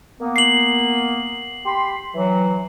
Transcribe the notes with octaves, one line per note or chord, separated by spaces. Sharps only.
A#3 B3
C7 F#7
G4 B5 C6
E3 F#3